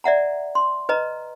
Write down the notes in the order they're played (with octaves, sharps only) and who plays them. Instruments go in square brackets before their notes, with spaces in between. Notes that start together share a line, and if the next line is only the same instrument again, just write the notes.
[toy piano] D5 E5 F#5 A#5
C6
B4 D#5 A#5